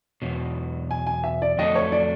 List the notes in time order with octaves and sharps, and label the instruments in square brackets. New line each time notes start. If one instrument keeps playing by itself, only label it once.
[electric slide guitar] E2 B2 F#3
[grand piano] G#5
G#5
E5
D5
[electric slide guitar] F2 D3 F#3 A3 D4 [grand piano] D#5
[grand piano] C#5
D5